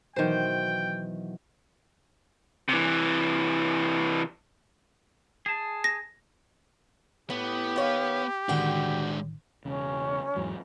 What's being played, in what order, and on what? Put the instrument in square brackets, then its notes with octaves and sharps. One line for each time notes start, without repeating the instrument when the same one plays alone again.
[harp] B2 E3 F#3 [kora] D#3 C5 [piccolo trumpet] G5
[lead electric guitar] C3 E3
[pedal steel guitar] G#4 A5
[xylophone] A#6
[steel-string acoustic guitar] A2 [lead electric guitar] B3 [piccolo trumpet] G4
[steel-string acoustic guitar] D#3 C#5 F5
[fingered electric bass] A1 D3 D#3 [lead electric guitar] G#3 D4 [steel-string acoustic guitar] F#4 G5
[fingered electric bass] E1 C#3 [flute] C#4
[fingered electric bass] E2 G#2 F#3